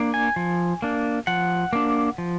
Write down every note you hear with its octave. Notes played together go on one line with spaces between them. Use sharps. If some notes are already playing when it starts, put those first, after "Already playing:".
Already playing: A#3 D4
G#5
F3
A#3 D4
F3 F#5
A#3 D4
F3